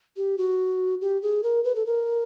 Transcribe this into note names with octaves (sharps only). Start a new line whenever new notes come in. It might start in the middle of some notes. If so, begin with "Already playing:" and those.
G4
F#4
G4
G#4
A#4
B4
A4
A#4